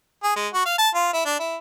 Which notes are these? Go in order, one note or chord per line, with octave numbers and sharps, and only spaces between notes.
G#4
G#3
F#4
F5
A5
F4
E4
D4
E4